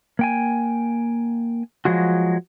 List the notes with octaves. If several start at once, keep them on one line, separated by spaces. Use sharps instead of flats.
A#3 G5 G#5
F3 F#3 G#3 F#4